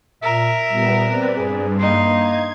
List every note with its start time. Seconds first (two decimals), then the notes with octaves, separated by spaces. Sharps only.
0.23 A#2 A#4 E5
0.68 A#2 G3 B3
1.03 C4 B4 D5
1.36 G2 G#4
1.80 A#3 D#4 C6
2.10 G#6